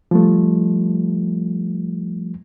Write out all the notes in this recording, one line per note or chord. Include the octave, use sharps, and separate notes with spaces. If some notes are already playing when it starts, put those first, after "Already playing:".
F3 G3 A3